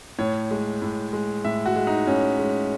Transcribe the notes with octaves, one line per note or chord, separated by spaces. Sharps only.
A2 C#5
G#3
A2
G#3
A2 E5
F#4
G#3
D#4
A2 C#4
G#3